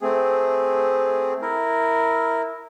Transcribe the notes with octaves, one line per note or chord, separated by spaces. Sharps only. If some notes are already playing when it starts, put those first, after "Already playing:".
A3 C4 G#4
E4 A#4